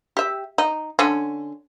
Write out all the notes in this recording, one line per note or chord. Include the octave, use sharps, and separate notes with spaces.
G4 E5
D#4
D3 C#4